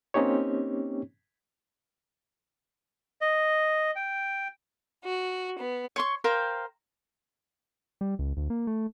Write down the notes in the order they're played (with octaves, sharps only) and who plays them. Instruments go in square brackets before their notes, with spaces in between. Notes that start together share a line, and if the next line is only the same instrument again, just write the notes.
[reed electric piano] A#3 C4 C#4 D#4 G4 C#5
[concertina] D#5
G5
[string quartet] F#4
B3
[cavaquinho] C#5 C6 C#6
A#4 C5 F5 G5
[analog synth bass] G3
C#2
D2
A#3
A3